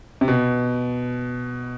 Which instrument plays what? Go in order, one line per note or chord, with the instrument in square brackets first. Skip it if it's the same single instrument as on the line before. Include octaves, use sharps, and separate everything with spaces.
[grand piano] C3
B2